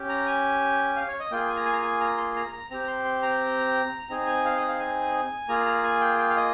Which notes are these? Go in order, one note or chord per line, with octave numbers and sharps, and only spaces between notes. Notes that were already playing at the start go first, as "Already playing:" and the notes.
Already playing: C#4 G4
A#5
G#5
F5
C#5
D#5
A#3 F4 G#4 G5
G#5
A#5
G#5
A#5
G#5
A#5
C6
A#5
A#5
C4 G4 A#5
A#5
C6
C6
A#5
C4 D#4 G#4 A#5
G#5
F5
D#5
F5
G#5
A#3 F4 G#4 A#5
A#5
G#5
G5
G5
F5
D#5